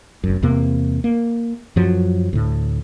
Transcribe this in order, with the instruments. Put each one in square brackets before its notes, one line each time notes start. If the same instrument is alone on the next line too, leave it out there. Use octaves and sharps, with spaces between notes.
[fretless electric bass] F1 F#2
E2 C3 A#3 C4
A#3
F#2 F3 F#3
D2 A2